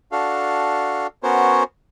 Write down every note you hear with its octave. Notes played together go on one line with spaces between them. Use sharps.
D4 F#4 A4 F5
B3 C#4 F#4 A#4 C5 C#5